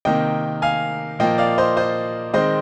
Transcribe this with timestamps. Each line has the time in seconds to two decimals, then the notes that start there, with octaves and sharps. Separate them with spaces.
0.05 C3 D#3 A#3 D#5 G5
0.62 F5 G#5
1.19 A#2 F3 A#3 D#5 G5
1.38 D5 F5
1.58 C5 D#5
1.77 C5 D#5
2.33 D#3 G#3 C4 C5 D#5